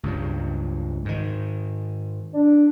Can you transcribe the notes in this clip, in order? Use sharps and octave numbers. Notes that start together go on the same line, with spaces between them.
C#2 G2 C#3
G#2 D#3
D4